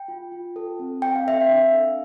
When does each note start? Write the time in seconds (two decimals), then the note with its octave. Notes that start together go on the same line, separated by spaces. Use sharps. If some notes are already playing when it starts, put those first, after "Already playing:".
Already playing: G5
0.08 F4
0.32 F4
0.56 A4
0.79 C4
1.02 C4 G5
1.15 F5
1.27 A4 E5
1.40 F5
1.50 D4
1.73 A4